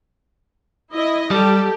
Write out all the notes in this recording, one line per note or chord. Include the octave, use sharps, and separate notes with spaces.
E4 D#5
G3 G4 A4